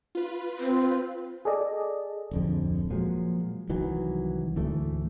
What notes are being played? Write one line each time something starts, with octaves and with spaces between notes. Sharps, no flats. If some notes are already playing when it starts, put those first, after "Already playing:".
F4 B4
C4
G#4 A4 D5 D#5
D1 F2 D3
A#2 F3 F#3 G#3
C2 D#3 E3 F#3
D2 G#2 E3 A3